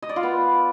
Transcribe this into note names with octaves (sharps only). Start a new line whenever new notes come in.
D#5
D5
F4
B3